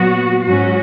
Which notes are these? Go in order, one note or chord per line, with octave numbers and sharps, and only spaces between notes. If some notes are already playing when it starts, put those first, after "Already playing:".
Already playing: A#2 F#3 B3 F#4
G#2 F#3 C#4 F#4